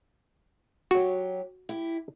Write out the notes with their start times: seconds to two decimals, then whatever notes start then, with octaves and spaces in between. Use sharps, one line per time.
0.91 F#3 F#4 G4
1.69 E4 G4